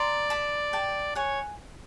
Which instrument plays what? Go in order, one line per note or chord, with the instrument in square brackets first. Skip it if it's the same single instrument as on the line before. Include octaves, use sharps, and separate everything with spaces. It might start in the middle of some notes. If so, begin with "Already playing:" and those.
Already playing: [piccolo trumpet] D5 [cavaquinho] A#5 C6
[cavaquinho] A5 B5
G5 A5
[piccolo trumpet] C#5 [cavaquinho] F#5 G#5